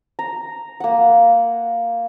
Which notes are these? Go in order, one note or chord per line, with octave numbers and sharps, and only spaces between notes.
A#5
A#3 F#5